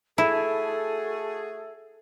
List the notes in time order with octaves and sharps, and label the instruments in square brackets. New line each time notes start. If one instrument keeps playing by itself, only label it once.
[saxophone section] A3 F#4 G#4 [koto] E4 [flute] A4 [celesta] E5